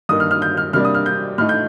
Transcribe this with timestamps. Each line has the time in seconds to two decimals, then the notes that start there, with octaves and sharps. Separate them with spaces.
0.09 G2 D#3 A#3 D#6
0.20 F6
0.31 F6
0.42 G6
0.57 F6
0.73 C3 G3 A#3 D4 F6
0.85 D#6
0.94 F6
1.06 G6
1.38 A2 A3 D#4 F6
1.49 G6